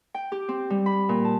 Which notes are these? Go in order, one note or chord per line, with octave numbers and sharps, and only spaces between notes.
G5
G4
C4
G3
B5
A#2
A5